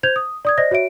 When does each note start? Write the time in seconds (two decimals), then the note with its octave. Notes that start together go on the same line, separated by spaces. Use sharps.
0.03 C5 G6 G#6 F7
0.16 D#6
0.45 D5 D#6 G#6
0.58 C5 D5 D#5 A#6
0.71 F#4 C#5 E5 D7